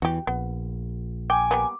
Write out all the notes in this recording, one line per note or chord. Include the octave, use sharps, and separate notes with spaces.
E2 E3 F#4 G4
A#1 B3
G5 G#5 D6
G3 A#3 B3